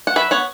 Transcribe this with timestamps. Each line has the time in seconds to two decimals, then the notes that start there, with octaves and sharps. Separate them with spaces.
0.07 F#5
0.16 F#3 B4 E5
0.31 B3 C#5 F#5